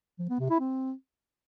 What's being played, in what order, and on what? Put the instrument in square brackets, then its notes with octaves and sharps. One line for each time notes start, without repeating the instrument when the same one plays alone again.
[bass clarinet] F3
B3
C3
E4
C4